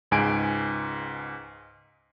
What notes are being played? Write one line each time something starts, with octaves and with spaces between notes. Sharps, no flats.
C#2 G#2 G#5 D7